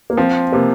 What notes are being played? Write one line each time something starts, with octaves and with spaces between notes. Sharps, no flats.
A#3
F3 C4
C3 A#3